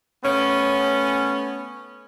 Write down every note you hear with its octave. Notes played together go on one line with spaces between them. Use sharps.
A3 B3 C#4